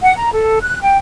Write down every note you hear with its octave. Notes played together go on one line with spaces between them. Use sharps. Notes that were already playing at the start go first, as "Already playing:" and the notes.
F#5
A#5
A4
F#6
G5